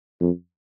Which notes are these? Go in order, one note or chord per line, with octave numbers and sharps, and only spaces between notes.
F2